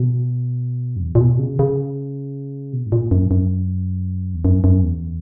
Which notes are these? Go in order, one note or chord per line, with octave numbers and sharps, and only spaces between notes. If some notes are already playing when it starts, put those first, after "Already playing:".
Already playing: B2
F#2
E2
A#2
B2
C#3
C#3
B2
G#2
A#2
F#2
F#2
E2
F#2
F#2
E2